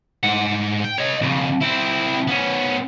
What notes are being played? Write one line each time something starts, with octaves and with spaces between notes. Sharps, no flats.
G#2 F#5
G5
C#5 D#5
F2 C#3
C4 E4
B3 C#4